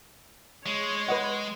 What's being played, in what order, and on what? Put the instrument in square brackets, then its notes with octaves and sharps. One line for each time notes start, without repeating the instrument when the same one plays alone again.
[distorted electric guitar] G#3 [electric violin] C#5
[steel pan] B4 D#5 F#5